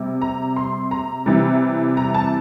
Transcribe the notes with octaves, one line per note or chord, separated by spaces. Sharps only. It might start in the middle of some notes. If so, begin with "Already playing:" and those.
Already playing: C3 G3
A#5
C6
A#5
C3 E3 G3
A#5
A5